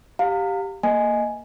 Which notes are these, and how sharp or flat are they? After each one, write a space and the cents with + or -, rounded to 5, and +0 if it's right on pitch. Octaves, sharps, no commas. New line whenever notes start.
G4 +0 F5 +25 A#5 -35
A#3 +0 D#5 +0 G#5 +5